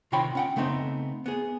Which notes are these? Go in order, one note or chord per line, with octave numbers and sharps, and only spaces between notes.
C3 D#3 F4 C#5 G5 B5
C#4 F#5 G5
C#3 A3 B3 C4 D#4
B3 G#4